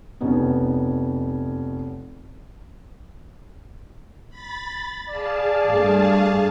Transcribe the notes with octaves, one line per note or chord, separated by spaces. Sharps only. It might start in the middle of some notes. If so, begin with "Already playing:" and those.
F1 B3 C#4 D#4
B5 A6
G#4 D5 F5 A5
G2 A3